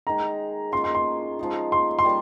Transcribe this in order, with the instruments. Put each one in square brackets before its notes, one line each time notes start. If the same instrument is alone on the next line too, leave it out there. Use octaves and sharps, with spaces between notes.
[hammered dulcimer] D#3 G#3 D#4 G#4 [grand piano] A#5
[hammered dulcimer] G#3 C#4 F4 G#4 [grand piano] C6
[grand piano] C6
C6
[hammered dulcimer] F3 G#3 D#4
[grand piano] C6
C6
[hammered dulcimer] G3 A#3 F4